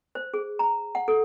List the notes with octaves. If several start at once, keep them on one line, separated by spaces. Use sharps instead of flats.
C5
G#4
A#5
F#5
A4